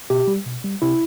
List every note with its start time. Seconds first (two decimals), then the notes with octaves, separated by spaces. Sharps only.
0.10 B2 G4
0.27 G3
0.46 B2
0.64 G3
0.82 C3 E4